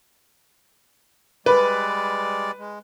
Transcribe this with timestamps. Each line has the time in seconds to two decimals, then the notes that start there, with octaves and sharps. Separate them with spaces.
1.46 G3 G#3 B4 D5
2.59 G#3